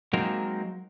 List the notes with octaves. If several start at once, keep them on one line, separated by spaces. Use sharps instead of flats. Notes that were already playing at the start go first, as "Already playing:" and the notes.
F#3 G#3 A#3 C4 D#4 A#4